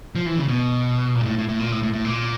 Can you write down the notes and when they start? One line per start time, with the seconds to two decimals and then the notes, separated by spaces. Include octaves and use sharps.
0.15 F3
0.26 E3
0.38 C#3
0.48 B2
1.15 A#2
1.21 G#2
1.26 A2
1.38 A2
1.48 A2
1.60 A#2
1.72 A2
1.83 A2
1.93 A2
2.04 A#2